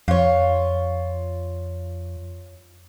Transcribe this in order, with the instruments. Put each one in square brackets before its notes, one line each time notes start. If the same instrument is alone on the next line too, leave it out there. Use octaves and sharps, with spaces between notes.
[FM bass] F2 [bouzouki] F4 C#5